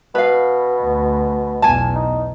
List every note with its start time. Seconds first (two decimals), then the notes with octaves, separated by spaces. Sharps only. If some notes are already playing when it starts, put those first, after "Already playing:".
0.15 B2 B4 F5
0.82 D2
1.62 B1 E2 G#5 A5
1.95 D#4